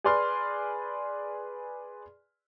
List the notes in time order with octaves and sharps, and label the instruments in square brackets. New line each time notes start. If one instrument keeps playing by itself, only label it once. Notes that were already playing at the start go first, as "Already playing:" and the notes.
[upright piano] G#4 B4 D5 C6 F6